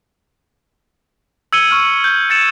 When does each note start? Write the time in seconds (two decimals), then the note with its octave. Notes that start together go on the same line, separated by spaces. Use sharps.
1.53 E6 G#6 C#7 D#7 G7
1.71 C#6 F6
2.04 G6
2.30 G#6 A6 C#7 E7